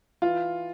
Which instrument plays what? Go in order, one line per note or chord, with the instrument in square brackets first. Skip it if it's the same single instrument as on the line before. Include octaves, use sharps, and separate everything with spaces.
[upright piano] E3 F4